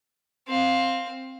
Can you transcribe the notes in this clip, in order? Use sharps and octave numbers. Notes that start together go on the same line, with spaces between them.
C4 F5